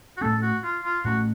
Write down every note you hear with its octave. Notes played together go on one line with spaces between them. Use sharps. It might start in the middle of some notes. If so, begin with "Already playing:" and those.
F#4
A2 A3 C#4 A4
F#4
F4
F4
A2 A3 C#4 F#4